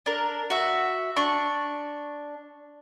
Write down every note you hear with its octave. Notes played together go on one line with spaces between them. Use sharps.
D4 A#4
F#4 E5
D4 C#6